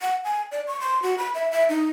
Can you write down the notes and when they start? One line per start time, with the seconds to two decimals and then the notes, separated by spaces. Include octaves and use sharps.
0.01 F#5
0.24 G#5
0.52 D5
0.67 C#6
0.80 C6
1.02 F#4
1.18 B5
1.34 E5
1.51 E5
1.69 D#4